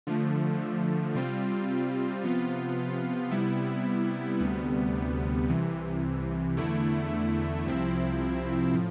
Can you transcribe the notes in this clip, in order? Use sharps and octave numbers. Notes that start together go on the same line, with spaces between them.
D3 F3 A3
C3 G3 C4 F4
C3 F3 B3 F4
C3 G3 B3 E4
D2 C3 G3 B3
C2 C3 E3
E2 D3 A3 E4
C2 C3 F3 C4 E4
A2 F3